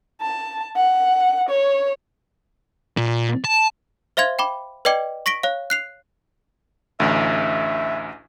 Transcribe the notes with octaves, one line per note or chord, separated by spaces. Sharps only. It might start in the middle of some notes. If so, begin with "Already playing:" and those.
A5
F#5
C#5
A#2
A5
C5 E5 F5 C6 G#6
G5 B5 D6
B4 D5 D#5 G5 D6 C#7
C#6 A#6 B6 D7 G7
C#5 F5
F#6 C7 F7
A1 D2 E5